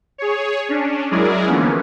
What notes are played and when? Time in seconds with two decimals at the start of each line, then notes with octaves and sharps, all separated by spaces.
0.18 G#4 C#5
0.69 C#4 D4
1.11 F#3 G#3 E4 G#4 A#4 D5
1.47 D3 E3 F3 A#3 B3 C#4